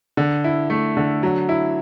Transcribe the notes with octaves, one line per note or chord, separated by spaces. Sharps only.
D3
E4
A3
D3
F#3
E4